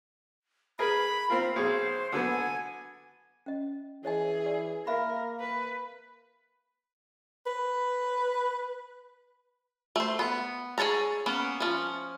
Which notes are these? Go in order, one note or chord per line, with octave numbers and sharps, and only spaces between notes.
G#4 A#4 B4 B5
C4 F4 A#4
B1 G#4 C5
D3 F#3 B3 G#5
C#4 D#5
E3 G#4 C#5 D#5 G#5
D5
A#3 A#4 E5 F5 B5
B4
B4
A3 C5
B3
G#4 A4 C#5 A5 A#5
A#3 B3 C#4
F3 C#4